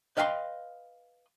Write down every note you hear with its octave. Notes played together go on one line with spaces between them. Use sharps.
B4 D#5 F5 G5 A#5 C6